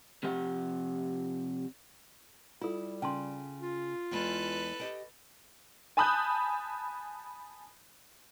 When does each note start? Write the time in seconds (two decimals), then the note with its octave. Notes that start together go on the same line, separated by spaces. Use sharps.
0.23 C3 F3 G4 F#5
2.61 G3 E4 F4 A4
3.02 C#3 G5 A5 C6
3.61 F4
4.11 E2 G#3 A4 B4
4.80 G4 D#5 G5
5.97 G#5 A5 B5 D#6 F#6 G6